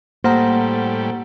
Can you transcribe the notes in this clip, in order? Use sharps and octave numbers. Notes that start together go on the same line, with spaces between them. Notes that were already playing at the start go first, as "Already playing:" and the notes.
A2 G3 A#3 C5 F#5 A#5